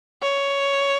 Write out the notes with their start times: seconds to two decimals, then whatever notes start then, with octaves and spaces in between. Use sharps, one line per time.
0.22 C#5